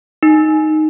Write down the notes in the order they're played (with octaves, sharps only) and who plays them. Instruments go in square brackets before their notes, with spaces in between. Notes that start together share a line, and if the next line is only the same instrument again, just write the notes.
[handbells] D#4